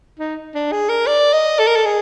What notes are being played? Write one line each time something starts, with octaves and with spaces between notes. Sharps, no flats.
D#4
D4
G#4
A#4
D5
D#5
A4
A#4
A4
G#4